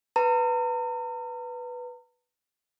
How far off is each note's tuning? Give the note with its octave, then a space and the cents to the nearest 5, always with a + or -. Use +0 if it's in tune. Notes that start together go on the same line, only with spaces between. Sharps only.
B4 +0 A#5 -40